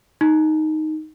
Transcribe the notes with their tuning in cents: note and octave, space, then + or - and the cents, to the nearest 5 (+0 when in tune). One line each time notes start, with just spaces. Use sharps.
D#4 +0